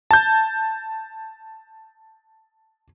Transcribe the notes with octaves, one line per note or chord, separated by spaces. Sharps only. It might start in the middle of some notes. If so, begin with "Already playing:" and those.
A5 G6